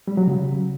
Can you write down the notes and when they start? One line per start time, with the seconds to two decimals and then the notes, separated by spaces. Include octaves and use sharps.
0.08 G3
0.17 F#3
0.27 C#3